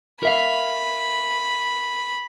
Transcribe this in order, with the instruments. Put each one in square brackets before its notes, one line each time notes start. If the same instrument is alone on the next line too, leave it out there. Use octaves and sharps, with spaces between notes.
[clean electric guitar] A#4 E5 F5 [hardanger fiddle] B5